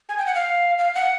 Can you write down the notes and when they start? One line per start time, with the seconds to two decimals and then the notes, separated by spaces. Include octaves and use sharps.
0.09 G#5
0.18 G5
0.26 F#5
0.35 F5
0.78 F5
0.95 F#5